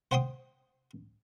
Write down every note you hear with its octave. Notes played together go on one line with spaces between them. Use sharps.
C5 F#5 G5 C6 D#6